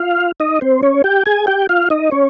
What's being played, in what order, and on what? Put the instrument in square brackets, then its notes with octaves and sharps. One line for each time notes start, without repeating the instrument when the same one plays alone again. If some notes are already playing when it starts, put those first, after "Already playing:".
Already playing: [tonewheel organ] F4 F5
D#4 D#5
C4 C5
C#4 C#5
G4 G5
G#4 G#5
G4 G5
F4 F5
D#4 D#5
C#4 C#5